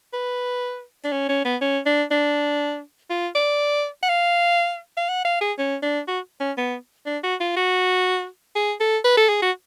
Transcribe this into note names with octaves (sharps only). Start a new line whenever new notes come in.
B4
D4
C#4
C#4
B3
C#4
D4
D4
F4
D5
F#5
F5
F5
F#5
F5
G#4
C#4
D4
F#4
C#4
B3
D4
F#4
F4
F#4
G#4
A4
B4
A4
G#4
F#4